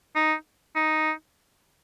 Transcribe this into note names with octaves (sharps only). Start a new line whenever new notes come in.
D#4
D#4